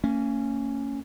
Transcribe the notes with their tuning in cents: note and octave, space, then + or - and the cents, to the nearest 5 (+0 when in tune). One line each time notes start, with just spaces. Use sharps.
A#3 -40 C#4 +0